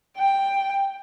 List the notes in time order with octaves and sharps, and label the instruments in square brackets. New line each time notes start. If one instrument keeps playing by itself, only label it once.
[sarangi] G5